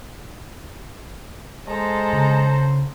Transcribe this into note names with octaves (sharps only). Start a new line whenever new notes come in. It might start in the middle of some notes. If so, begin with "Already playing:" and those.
G#3 A4 C5 A#5
C#3